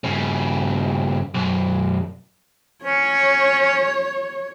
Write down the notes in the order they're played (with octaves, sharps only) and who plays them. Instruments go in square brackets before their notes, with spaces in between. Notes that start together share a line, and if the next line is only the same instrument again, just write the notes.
[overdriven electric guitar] G2 C#3
B1 F#2
[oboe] C#4 [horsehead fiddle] C#5